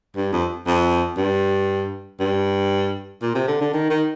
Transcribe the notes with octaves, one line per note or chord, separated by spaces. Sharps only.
G2
F2
F2
G2
G2
A#2
C3
D3
D3
D#3
D#3